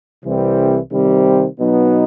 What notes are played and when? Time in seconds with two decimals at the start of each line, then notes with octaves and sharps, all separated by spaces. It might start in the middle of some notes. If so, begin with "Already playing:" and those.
0.24 C2 C3 E3 G3 C4
0.92 C3 D#3 G3 C4
1.59 B2 F#3 B3 D#4